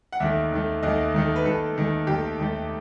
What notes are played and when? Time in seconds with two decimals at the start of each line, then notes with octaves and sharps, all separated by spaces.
0.12 F#5
0.20 D#2 D#3 A3 E5
0.52 D#2 D#3 A3
0.83 D#2 D#3 A3 D#5
1.14 D#2 D#3 A3
1.36 B4
1.45 D#2 D#3 A3 A4
1.77 D#2 D#3 A3
2.07 D#2 D#3 A3 G4
2.39 D#2 D#3 A3